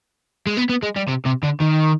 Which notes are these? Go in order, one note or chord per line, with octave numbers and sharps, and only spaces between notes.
G#3
B3
B3
G#3
G3
C3
C3
D3
D#3